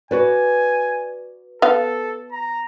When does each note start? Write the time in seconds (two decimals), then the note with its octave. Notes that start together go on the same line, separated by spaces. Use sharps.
0.11 F#4 B4 D5 G#5
1.62 B3 A4 F5
2.32 A#5